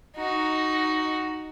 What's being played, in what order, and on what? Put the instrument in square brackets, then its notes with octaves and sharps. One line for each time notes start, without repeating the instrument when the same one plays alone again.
[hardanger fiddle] D#4 F#4